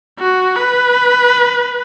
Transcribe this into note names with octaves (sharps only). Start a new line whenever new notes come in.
F#4
B4